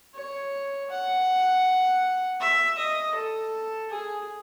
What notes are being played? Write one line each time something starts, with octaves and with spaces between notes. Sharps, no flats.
C#5
F#5
E5
D#5
A4
G#4